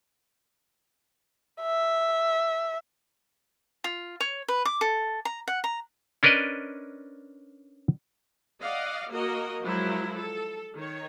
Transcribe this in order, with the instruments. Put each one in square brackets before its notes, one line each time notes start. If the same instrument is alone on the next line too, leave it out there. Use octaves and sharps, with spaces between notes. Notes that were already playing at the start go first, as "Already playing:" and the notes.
[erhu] E5
[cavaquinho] F4
C#5
B4
D6
A4
A#5
F#5
A#5
[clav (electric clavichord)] C#4 D4 A#4 B4 D5 D#5
[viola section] D5 D#5 F5 F#5
A#3 F#4 A#4 D#5
F3 F#3 G#3 E4 A#4
A4
D#3 C#5